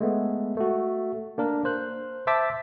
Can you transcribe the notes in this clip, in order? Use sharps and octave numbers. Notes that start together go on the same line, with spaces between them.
G#3 A3 B3
A3 F#4
A#3 D4 A#4
C5 F#6
C5 E5 A5 D6 B6